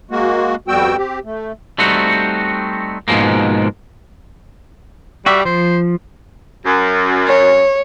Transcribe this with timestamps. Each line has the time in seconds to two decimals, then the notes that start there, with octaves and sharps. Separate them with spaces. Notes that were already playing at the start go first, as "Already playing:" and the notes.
0.11 G#3 A#3 F#4
0.68 F2 G3 B3 F#4 G5 E6
0.97 C4 G4
1.25 A3
1.78 G3 A3 C4 D#4 F#4
3.08 G#2 B2 F3 G#3 A#3
5.26 G3 F#4 G4 E5
5.45 F3 C5
6.65 F#2
7.27 C#5